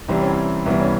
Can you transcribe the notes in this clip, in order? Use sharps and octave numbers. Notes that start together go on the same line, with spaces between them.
C2 C3 E3 G3 C4
C#4
C4
C2 C3 E3 G3 B3
C#4